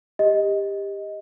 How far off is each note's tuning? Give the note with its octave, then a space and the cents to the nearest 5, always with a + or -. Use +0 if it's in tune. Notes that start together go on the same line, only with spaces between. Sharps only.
G4 +20 D#5 +10